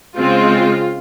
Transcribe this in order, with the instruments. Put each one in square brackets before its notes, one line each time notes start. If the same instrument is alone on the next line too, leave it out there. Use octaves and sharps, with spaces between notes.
[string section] C#3 G#3 C4 F4